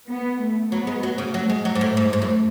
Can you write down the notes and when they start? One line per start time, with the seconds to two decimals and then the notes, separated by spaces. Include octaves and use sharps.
0.09 B3
0.41 A3
0.72 F#3 B3
0.87 G#3
1.03 F#3 A3
1.18 C#3
1.34 F#3
1.50 G#3
1.65 F#3 A3
1.75 G#2
1.81 A2
1.97 G#2
2.13 G#2
2.22 F#2